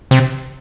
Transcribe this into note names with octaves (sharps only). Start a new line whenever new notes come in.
C3